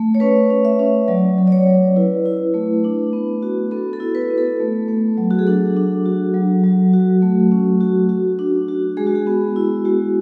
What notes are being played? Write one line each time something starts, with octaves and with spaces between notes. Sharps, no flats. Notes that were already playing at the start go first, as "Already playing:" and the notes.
Already playing: A3
C#5
C#4 B4
C#4
E5
C#4
F#3 D5
F#3
D5
C#5
F#3
E4 B4
E4
A3
D4
B3
F#4
B3 A4
A4
E4
B4
B3
A4
A3
A3
F#3
F#4
G#4
D4 A4
D4
F#4
F#3
F#3
F#4
A3
C#4
F#4
F#4
D4
F#4
G#3 G#4
F#4
G#4
B3
E4
G#3 F#4